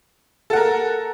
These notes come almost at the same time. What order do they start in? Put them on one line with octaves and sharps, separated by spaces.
A4 F#5 A#4